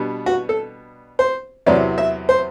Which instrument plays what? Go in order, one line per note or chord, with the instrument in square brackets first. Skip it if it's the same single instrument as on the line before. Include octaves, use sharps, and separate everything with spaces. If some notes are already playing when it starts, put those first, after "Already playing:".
Already playing: [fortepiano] B2 G3 B3 D4
F#4
A4
C5
E2 C3 F#3 C4 D5
E5
C5